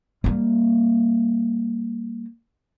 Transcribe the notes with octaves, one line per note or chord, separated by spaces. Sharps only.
G3 A#3